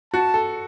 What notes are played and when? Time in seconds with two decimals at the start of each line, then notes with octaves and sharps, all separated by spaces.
0.14 F#4 A5
0.34 A4